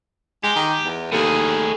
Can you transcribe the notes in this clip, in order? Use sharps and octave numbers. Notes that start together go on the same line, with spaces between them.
G#3 G4
D#3
E2
D#2 A2 G#4 A4